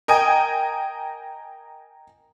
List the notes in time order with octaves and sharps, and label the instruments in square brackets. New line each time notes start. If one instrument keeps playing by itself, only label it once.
[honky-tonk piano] A#4 D#5 G5 G#5